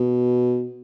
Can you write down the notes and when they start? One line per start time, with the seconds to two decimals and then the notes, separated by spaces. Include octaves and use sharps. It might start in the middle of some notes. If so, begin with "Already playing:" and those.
Already playing: B2